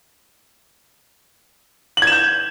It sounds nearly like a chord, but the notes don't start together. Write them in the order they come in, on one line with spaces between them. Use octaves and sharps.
F#7 G#6 E7 G6